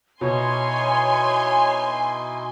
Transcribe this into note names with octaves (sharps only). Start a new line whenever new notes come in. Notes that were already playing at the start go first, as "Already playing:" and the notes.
B2 D#4 E4 C#5 G#5 C6